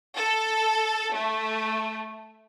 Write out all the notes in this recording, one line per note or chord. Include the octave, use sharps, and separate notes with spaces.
A4
A3